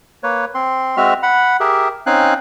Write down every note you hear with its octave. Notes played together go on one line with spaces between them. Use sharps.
A#3 B4 C#5
C4 C6
G#3 C4 F#4 E5 F6
F#5 B5
G4 G#4 A#4 E5
C4 C#4 D#4 F5 G#5 F#6